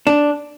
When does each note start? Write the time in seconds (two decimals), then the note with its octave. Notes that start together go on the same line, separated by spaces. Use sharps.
0.07 D4